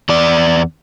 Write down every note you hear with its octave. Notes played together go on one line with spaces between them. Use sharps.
E2 D5